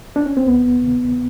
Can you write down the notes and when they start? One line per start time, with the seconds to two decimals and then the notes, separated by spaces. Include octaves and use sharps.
0.16 D4
0.26 C#4
0.37 C4
0.46 D2 B3
0.82 C3 D#3